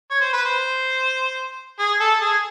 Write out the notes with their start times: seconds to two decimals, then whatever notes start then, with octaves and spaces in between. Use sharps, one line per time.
0.11 C#5
0.21 C5
0.33 B4
0.45 C5
1.79 G#4
2.00 A4
2.21 G#4